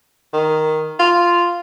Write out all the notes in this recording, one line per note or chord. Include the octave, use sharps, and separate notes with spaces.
D#3
F4